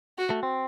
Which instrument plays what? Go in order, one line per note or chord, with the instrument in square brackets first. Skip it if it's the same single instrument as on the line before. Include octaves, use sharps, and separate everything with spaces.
[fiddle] F#4
[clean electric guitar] A3
C4